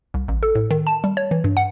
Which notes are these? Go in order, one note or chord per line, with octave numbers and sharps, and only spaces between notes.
C2
A1
A4
A2
D#3
A5
G3
C#5
E3
G2
F#5